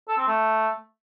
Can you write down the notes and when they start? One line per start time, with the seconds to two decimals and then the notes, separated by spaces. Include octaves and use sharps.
0.09 A4
0.18 C4
0.27 A3